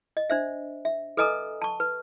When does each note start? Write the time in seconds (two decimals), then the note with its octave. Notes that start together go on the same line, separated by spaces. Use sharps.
0.17 D#5
0.30 D4 C5 E5
0.85 E5
1.17 A4 B4 D#5 G#5 A#5 D#6
1.62 A5 C#6
1.80 B4